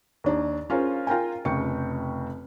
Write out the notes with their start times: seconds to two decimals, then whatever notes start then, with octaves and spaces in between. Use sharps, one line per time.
0.24 D#2 D4 D#4
0.70 C#4 F4 G#4 A#4 C5
1.07 F4 A#4 G5 G#5
1.45 F1 C#3 G5 C#6 C#7